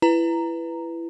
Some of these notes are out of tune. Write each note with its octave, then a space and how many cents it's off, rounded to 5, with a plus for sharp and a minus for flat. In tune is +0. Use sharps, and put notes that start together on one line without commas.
E4 +25 B4 +0 A#5 -5